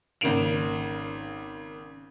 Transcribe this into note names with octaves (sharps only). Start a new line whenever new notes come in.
G#1 C#3 A#3 D7 F7